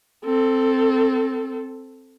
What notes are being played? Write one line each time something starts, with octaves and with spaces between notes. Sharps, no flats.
C4 A4